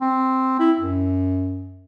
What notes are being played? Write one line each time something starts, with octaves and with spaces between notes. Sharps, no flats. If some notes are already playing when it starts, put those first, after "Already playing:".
C4
E4
F#2